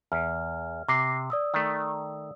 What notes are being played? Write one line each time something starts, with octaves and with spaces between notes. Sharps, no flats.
E2 F6
C3 D6 A#6 C7
D5 D#6 E6
D#3 A3